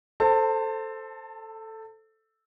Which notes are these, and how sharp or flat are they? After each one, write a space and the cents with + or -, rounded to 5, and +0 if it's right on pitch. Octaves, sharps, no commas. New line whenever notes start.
A4 +0 C5 +0 A5 +30